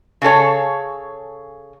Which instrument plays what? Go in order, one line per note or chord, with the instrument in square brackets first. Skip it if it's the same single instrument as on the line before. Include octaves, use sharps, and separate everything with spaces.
[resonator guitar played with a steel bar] C#3 G#4 A4 C#5